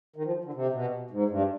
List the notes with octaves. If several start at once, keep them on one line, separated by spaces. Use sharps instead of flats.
D#3
F3
D3
C3
B2
G#2
G2